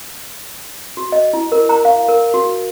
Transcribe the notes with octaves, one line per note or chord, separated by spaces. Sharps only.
F#4
D#5
E4
A#4
A#5
F5
A#4
F#4